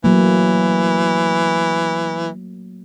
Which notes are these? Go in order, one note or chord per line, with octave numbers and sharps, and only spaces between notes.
E3 F#3 A3 A#3